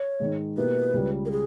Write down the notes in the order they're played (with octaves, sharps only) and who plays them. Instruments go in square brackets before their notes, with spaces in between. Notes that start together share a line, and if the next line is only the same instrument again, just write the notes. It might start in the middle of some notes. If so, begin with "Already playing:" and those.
Already playing: [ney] C#5
[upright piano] G#2 D#3 G#3
[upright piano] B2 A#3 E4 G4 [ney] B4
[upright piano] C#2 C#3 G3
[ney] A#4
G#4